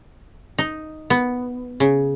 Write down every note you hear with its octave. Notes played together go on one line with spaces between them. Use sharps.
D#4
B3
C#3